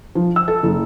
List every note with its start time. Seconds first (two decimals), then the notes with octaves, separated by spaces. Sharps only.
0.15 F3
0.36 E6
0.48 A4
0.63 F#1